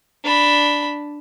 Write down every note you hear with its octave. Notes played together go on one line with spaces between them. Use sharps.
D4 B5